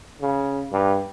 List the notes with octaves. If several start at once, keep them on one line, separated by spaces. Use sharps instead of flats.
C#3
G2